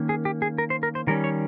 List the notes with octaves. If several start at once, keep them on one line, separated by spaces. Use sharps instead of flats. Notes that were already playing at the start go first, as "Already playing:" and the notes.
Already playing: D#3 A#3 C#4
G#4
G4
G#4
A#4
C5
A#4
C5
D#3 G3 C#4 A#4
C#5